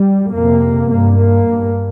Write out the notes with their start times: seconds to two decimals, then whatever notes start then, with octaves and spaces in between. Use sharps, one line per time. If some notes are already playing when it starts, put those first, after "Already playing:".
Already playing: G3
0.32 F2 C3 A#3
0.89 G2 A#3
1.18 A#3
1.46 G2